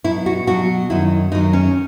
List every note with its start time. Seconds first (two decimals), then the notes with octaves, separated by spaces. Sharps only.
0.04 B2 F#3 E4
0.26 F#4
0.47 B2 F#3 F#4
0.90 F#2 D#3 F#3 E4
1.32 F#2 D#3 F#3 D#4
1.53 C#4